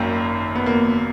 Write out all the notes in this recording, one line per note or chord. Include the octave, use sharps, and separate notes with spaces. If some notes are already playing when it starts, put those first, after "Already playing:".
Already playing: G#1 F#2 D#3 A#3
B3
A#3